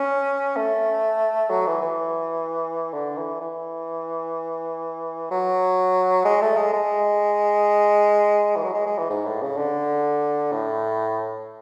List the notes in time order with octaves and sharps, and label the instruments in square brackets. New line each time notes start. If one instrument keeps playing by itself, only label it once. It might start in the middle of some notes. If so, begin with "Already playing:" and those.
Already playing: [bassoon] C#4
A3
F#3
E3
E3
D3
E3
E3
F#3
G#3
A3
G#3
G#3
E3
F#3
G#3
G#3
E3
G#2
A2
C#3
D3
A2